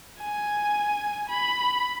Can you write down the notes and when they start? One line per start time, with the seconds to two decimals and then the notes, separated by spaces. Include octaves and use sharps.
0.21 G#5
1.30 B5